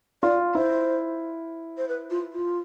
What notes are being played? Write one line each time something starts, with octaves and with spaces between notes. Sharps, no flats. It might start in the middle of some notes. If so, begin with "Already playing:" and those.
F4 D5
E4 C5
C5
B4
F4
F4